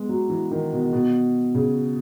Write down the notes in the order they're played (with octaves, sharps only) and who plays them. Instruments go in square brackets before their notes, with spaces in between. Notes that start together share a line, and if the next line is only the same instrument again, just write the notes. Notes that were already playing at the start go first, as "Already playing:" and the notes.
Already playing: [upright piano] G#3 B3
F#3
E3
D#3
B2
B2
C#3